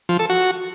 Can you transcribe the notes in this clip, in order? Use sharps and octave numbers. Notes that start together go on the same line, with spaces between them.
F3
A4
F#4